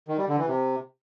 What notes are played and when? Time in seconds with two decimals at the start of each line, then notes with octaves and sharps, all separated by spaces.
0.08 D#3
0.18 G3
0.28 D3
0.38 E3
0.48 C3